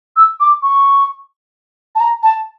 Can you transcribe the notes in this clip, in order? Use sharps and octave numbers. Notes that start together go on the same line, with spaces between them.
E6
D6
C#6
A5
A#5
A5